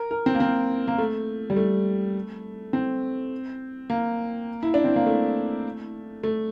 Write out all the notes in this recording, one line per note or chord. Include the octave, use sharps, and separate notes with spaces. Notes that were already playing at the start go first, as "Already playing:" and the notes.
Already playing: A#4
A#4
C4
A#3
C4
A#3
A3
G3
A3
C4
A#3
E4
D4
C4
A#3
A3
A3